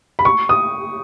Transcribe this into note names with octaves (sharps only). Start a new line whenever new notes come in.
B5
C#6
D#6